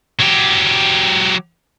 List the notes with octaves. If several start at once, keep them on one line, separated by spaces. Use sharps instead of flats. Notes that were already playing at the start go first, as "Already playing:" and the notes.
F#3 G4